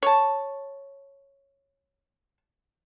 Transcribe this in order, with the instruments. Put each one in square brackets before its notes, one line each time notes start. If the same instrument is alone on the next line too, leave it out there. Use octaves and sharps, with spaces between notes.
[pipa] C#5 A5